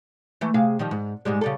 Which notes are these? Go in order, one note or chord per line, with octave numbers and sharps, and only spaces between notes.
E3 A3
C3 G#4 F5
D#3 F3 G3
G#2
G#2 G3 G#3
C#3 G3 A4